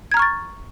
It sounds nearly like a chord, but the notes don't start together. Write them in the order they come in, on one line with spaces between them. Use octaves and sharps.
G#6 A#5 F6 C#6 A6